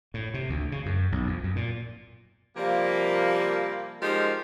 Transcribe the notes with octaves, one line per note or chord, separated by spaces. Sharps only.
A2
C3
D2
C#3
F#2
B1
F2
F#2
A#2
C3 F3 G3 A#3
F3 G#3 D#4 G4 A#4 C5